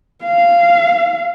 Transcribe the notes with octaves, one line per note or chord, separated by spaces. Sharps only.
F5